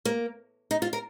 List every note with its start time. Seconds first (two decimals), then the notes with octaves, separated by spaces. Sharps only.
0.05 A#3
0.71 D#4
0.82 F4
0.93 A#4